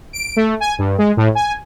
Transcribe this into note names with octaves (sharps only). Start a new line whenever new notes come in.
D7
A3
G#5
G2
G#3
A2
G#5